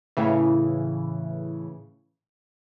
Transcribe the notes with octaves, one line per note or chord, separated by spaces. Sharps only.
A2 C#3 E3